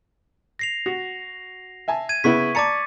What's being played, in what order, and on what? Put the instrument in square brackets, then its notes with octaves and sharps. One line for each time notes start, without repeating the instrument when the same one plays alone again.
[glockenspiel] A#6 C7 F7
[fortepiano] F#4
E5 G#5 A5
[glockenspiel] G#6 D#7
[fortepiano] C#3 B3 E4 [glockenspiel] C#6 B6
[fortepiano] D5 A5 A#5 [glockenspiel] D6 A6 C#7